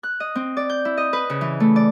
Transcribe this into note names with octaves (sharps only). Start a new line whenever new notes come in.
F#6
D#5
C4
D5
G6
E4
D#5
B4
C#3
E3
A3
D5